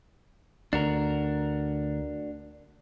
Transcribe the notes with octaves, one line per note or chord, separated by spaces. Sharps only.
D2 D4 F#4 A#4